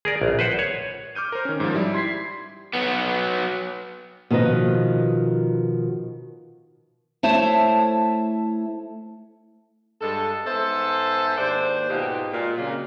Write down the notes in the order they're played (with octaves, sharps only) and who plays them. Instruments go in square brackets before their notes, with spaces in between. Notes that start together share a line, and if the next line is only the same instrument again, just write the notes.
[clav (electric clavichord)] G#4 A#4 D5
A#1
B4 C5 F#5
C#5
[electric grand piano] D6 F6 G6 D#7
A#4 C5
D#3 C#4
G#2 F3
G3 E4
C6 G#6 B6 C7
[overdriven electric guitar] F#3 B3
[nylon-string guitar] B2 D#3 F3 B4 D#5
[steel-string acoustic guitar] A3 E4 C5 C#5 A5
[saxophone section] G2 G#3 A4
G#2 B3 A4 C5 E5
D#2 G#2 D4 C5
G#2 B2 F4 G4
A#2 G#3
C#3 F#3 A#3 C4 F4